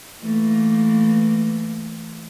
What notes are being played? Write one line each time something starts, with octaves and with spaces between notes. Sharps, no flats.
E3 A3 A#3